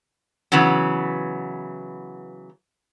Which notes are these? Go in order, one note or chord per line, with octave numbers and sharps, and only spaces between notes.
C#3 E3 F#3 B3